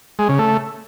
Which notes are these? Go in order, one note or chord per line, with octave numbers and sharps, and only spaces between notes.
G#3
C#3
A3